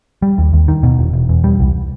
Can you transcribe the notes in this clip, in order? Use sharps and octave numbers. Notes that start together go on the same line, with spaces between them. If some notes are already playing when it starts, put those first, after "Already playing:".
G3
D#2
D#2
D#3
B2
E1
E1
E2
G3
C2